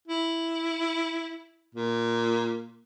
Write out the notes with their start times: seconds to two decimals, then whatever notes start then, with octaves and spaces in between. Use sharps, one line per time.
0.08 E4
1.75 A#2